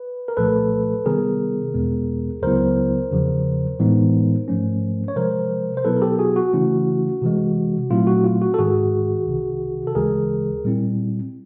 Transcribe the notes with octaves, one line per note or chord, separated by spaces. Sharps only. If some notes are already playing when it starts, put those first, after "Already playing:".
Already playing: B4
A#4
C2 A#2 F3 A3 A4 B4
C3 D#3 G3 B3 G#4 A#4
E2 B2 G#3 B3
C#2 C#3 F#3 B3 E4 A#4 C5
E2 C#3 F3
A2 E3 G#3 B3 D#4
G#2 F3 A3 C#4
C#5
C3 F3 G#3 A#4 C5
C5
B2 F#3 B3 E4 A4 B4
A#4
G4 A4
F#4 G#4
F#4
C#3 E3 A3 C#4 E4
C3 E3 G#3
A#2 F#3 A3 C4 E4 F4
F#4
F4
F#4
A4
G#2 D#3 G#3 F#4 G#4
C2 C3 D#3
A4
D2 C#3 E3 G#3 G#4 A#4
A#2 G3 C4 E4